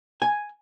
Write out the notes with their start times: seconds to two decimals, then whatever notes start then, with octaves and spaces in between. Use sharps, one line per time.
0.22 G#5